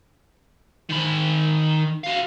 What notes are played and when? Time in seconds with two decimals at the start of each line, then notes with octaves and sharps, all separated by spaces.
0.89 D#3 B5
2.04 F#4 F5